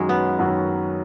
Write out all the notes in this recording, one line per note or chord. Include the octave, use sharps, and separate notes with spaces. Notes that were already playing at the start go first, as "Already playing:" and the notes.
Already playing: F#2 D#3 F#3 G#3 C#4 F#4
B3
F#2 D#3 F#3 C#4 F#4